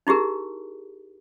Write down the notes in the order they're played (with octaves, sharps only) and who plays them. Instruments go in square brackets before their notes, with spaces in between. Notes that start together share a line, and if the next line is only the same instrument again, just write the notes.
[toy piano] D#4 E4 G4 G#4 A#4